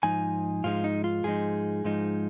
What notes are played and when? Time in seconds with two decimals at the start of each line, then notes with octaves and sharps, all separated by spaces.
0.03 G#2 F3 D#4 G#5
0.64 G#2 F3 G#3 D#4 F4
0.84 D#4
1.04 F4
1.24 G#2 F3 G#3 D#4 G#4
1.84 G#2 F3 G#3 D#4